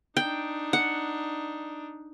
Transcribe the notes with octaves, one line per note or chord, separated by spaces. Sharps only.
D4 D#4 G5
F#5